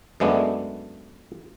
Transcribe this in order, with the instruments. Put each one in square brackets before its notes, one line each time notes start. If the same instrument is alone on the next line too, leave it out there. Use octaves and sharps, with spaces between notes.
[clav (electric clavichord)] F#2 G#3 A3 B3 D4